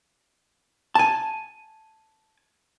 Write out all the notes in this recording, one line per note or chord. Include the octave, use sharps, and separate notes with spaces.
G#5 A5